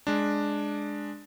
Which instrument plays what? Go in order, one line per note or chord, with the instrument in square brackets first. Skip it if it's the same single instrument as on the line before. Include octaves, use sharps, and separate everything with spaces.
[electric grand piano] G#3 D4